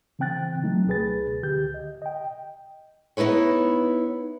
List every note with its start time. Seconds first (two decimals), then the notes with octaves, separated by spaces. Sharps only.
0.19 C#3 E3 C4 G5 F#6 A6
0.63 F#3 A3 D#4
0.87 C#2 B2 G#4 B4 A6
1.43 C#2 D3 G4 G6
1.74 D#5
2.02 D#5 G5
3.17 B3 D#4 E4 B4 C#5